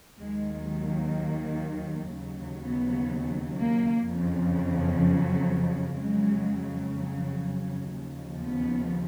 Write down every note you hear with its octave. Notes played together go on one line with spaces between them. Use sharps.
D#2 D#3 F#3 G#3
A#3
D#2 C#3 F#3
B3
A#3
F2 C#3 F3
F#3
F2 C#3 F#3 G#3
F#3
F#3
D#2 C#3 F3
B3